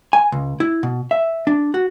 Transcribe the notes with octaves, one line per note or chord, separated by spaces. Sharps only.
G#5
C#2
E4
B2
E5
D4
F#4